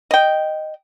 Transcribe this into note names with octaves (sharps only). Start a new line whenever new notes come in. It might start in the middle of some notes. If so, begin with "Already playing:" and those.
D#5 G5